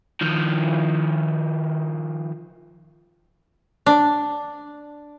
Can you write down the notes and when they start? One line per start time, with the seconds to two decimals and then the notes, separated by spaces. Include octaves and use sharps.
0.21 D#3 F3
3.86 D4